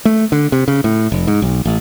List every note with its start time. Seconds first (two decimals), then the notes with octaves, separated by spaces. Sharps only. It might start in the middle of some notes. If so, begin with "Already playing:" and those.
0.05 A3
0.32 D3
0.52 C3
0.68 C#3
0.84 A2
1.12 F1
1.27 G#2
1.42 B1
1.65 A1